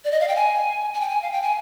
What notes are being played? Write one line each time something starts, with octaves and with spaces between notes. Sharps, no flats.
D5
D#5
F5
G5
G#5
G#5
G5
G#5
F5
G5
G#5